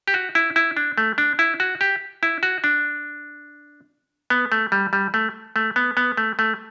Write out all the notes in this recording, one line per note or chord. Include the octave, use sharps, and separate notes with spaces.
G4
F#4
E4
E4
D4
A3
D4
E4
F#4
G4
E4
F#4
D4
B3
A3
G3
G3
A3
A3
B3
B3
A3
A3